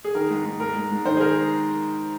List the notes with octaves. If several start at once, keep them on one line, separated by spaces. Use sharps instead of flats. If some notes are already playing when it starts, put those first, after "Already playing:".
G#4
D#3 A#4
G#2
G#2
G#2 A#4
G#2
G#2
D#3 C5
G#4
D#3 A#4